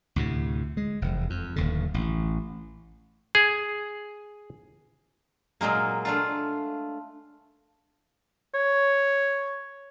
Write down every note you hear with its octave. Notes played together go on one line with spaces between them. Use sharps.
D2 A2 C3
G#3
F1 E2
F2
D1 D#2 D3
A1
G#4
A#2 F#3 G#3 A#3
A3 D4 F4
C#5